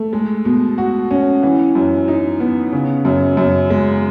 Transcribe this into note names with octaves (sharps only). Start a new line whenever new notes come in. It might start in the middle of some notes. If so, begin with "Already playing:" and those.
Already playing: A3
G#3
B2
F#4
C#4
E3
F#2
D#4
B3
C#3
F#2
F#2
G#3